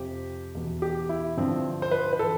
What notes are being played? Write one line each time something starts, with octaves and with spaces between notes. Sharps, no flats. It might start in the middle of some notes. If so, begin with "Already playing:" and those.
Already playing: F2 C3 F3 G4
E2 B2
G4
E4
G2 D3 F3 C4
C5
B4
B4
E3 A4